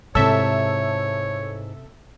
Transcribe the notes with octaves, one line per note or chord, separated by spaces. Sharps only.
G#2 C3 E4 A4 C#5 E5